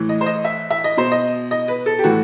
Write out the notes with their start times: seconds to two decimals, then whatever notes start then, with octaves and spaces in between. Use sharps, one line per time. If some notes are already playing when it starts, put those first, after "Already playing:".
Already playing: A2 E3
0.09 D#5
0.21 C5
0.26 D#5
0.45 E5
0.70 E5
0.84 D#5
0.97 B2 C5
1.12 D#5
1.51 D#5
1.68 B4
1.86 A4
1.99 G4
2.04 A2 E3 F#4